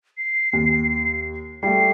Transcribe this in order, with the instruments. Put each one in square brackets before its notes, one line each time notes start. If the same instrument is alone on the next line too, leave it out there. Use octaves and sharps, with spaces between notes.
[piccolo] C7
[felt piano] D#2
[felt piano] G3 A3 [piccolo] C7